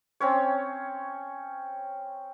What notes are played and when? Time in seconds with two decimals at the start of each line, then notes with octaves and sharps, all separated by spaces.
0.20 C4 C#4 C#5